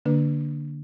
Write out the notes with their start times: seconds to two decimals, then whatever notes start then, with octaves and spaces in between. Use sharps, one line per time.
0.05 D3 A#3 D4 B4